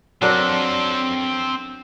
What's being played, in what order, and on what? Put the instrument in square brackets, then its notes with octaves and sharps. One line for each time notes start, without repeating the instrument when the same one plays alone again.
[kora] F#3 D4 A#4 [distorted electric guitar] C4 A4